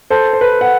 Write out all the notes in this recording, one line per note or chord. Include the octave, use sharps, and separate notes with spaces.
A4 C5
C5
B4
F#5